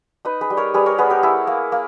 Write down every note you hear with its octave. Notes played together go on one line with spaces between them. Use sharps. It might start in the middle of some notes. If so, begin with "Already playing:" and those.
D#4 B4 D#5
G#4 B4
G3
A#4 C#5
G3 G#4 B4
A#4 C#5
B3 G#4 B4
G4 A#4
E4 G#4
A#3
A#3